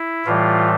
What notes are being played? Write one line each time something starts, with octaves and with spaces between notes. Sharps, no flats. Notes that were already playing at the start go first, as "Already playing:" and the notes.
Already playing: E4
A2 E3 G3 F4